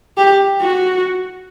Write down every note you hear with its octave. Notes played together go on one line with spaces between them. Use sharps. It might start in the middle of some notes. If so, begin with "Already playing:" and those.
G4
F#4